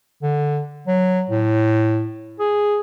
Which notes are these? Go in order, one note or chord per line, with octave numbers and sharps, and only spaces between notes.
D3
F#3
A2
G#4